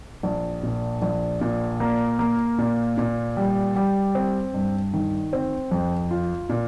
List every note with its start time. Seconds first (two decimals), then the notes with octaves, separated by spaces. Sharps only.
0.23 A#1
0.63 A#2
1.02 A#1
1.41 A#2
1.80 A#3
2.19 A#3
2.59 A#2
2.98 A#2
3.37 G3
3.76 G3
4.15 C4
4.54 G2
4.93 D#3
5.33 C4
5.71 F2
6.11 F4
6.49 A#2